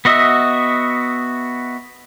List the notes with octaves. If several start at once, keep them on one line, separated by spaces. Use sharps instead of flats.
B3 F#4 D#5 E5